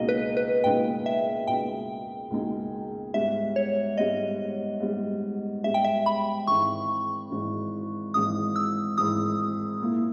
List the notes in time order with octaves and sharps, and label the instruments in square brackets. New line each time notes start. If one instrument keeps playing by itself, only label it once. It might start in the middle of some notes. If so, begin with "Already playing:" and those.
Already playing: [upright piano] C#2 B2 A#3 D#4 G#4 [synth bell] D#5
[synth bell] B4
B4
[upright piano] C#2 B2 A#3 D#4 G#4 [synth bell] G5
[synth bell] E5
[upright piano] C#2 B2 A#3 D#4 G#4 [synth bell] G5
[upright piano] C#2 B2 A#3 D#4 G#4
[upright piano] G#2 G3 B3 [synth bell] E5
[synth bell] C#5
[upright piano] G#2 G3 B3 [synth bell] D#5
[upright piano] G#2 G3 B3
[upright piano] G#2 G3 B3 [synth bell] E5
[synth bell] G5
E5
B5
[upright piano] G#1 G#2 E3 [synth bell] C#6
[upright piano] G#1 G#2 E3
[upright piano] G#1 G#2 E3 [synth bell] D#6
[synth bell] E6
[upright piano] G#1 G#2 E3 [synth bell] D#6
[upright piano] A#2 A#3 E4